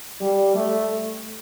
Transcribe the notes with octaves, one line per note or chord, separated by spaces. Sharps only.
G3
A3